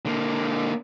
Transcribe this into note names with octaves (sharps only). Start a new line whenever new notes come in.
D3 A#3